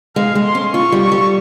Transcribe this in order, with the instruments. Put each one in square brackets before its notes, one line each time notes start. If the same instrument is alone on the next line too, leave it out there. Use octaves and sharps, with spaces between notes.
[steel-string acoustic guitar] G#3 [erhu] F5
[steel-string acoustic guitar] G#3
[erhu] C6
[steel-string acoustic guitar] C#4
[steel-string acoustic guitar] F4 [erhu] C#6
[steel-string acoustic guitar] G3
[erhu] C#6
[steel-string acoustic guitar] G3